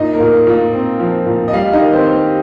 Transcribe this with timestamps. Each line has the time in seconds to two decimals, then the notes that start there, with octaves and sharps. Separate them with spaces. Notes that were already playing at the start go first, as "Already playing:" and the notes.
Already playing: A#2 D#4 D#5
0.13 A#3 A#4
0.20 A#2
0.33 F4
0.47 A#2
0.73 C4
1.00 F3
1.26 A#2
1.48 D#5
1.53 G3 F4 F5
1.73 D#4 D#5
1.80 D#3
1.93 C4 C5
2.07 A#3
2.13 G4